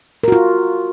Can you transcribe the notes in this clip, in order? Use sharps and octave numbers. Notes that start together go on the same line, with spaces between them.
F4 F#4 A#4